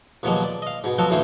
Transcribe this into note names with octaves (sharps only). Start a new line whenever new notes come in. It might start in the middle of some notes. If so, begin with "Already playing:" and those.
D#2 B2 F3 F#3 G#3 A#3
D5
D#5 F5
G#2 B2
F3 F#3 B3 F#4 A4
D2 A2 E3 C#4 F4 C5